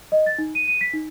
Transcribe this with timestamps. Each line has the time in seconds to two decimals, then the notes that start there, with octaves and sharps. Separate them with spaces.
0.12 D#5
0.26 A6
0.38 D#4
0.55 D#7
0.68 D#7
0.81 B6
0.94 D#4